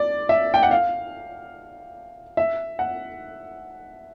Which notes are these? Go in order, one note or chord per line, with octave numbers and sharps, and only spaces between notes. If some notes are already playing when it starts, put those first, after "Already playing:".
Already playing: D5
E5
G5
F#5
F5
E5
F#5